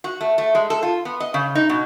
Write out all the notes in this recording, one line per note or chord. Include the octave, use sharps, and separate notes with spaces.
F#4
A3
A3
G#3
A4
F4
B3
D#5
C#3
D#4
B2